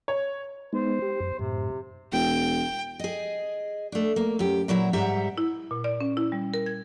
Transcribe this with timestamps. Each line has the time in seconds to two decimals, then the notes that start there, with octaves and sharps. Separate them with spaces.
0.08 C#5
0.73 G#3 B3 D#4 C5
1.02 G4
1.20 F#2
1.39 F#2 A2 C3
2.12 E1 G5
2.99 G#4 D#5
3.92 A3 D4
4.16 A#3
4.39 F#2 G4
4.68 A#2 F#3 E4 D5 A#5
4.93 G#2 G3 E5 F#5 A#5
5.38 E4
5.71 A#2
5.84 D5
6.01 C#4
6.17 E4
6.32 G3
6.54 A#4
6.66 G#6